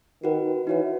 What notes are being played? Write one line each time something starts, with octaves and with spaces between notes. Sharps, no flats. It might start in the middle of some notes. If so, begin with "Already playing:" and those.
D#3 F#4 B4 F#5
E3 D#4 F#4 C#5 F#5